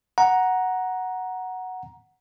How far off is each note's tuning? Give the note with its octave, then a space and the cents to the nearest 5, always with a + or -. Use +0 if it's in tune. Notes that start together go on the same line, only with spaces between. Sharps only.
F#5 +0 A#5 +10